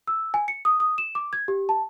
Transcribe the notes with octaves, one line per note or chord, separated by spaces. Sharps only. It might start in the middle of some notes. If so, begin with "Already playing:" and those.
E6
G#5
C#7
D#6
D#6
E7
D6
G#6
G4
A5